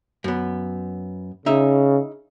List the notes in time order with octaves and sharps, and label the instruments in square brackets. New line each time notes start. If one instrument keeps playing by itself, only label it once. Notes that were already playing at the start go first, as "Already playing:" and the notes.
[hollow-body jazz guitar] F#2 B3
[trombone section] C#3 [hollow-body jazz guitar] D#4 E5